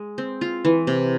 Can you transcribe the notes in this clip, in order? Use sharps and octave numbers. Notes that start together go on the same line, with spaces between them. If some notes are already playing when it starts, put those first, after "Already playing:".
Already playing: G#3
C4
F4
E3
C3